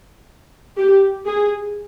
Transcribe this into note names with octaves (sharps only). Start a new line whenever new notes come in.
G4
G#4